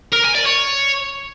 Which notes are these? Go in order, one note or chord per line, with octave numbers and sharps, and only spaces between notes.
A#4
G#5
D5
C#5